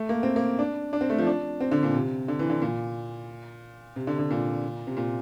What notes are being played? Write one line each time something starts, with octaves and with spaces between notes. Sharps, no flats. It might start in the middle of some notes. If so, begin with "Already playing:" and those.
Already playing: A3
A#3
C4
A#3
D4
D4
C4
A3
F3
D4
C4
D3
A#2
C3
D3
E3
D3
A#2
C3
D3
D3
A#2
C3
A#2